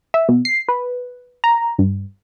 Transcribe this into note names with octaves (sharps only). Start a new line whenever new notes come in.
E5
B2
C7
B4
A#5
G2